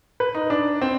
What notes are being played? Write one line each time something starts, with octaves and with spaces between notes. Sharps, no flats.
B4
D#4
D4
C4